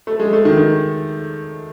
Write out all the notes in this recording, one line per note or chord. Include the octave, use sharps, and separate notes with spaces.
A3
G#3
A3
D#3
D#3